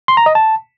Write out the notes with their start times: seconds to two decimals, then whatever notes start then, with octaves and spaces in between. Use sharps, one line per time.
0.08 C6
0.17 A#5
0.26 D#5
0.35 A5